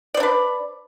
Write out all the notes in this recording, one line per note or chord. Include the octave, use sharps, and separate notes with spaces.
D4 B4 C5 D5